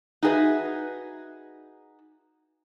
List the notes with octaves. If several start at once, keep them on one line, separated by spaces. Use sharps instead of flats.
D#4 F#4 G#4 B4 E5